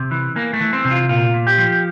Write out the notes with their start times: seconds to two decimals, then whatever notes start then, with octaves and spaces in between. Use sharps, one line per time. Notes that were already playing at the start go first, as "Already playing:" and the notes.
Already playing: C3
0.11 E3
0.36 E3 A#3
0.53 A3
0.61 E3
0.73 C4
0.85 C3
0.91 F4
1.09 A#2 F4
1.34 A#2
1.47 G4
1.58 F3